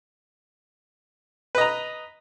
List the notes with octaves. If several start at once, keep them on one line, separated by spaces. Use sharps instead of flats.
B4 D#5 A#5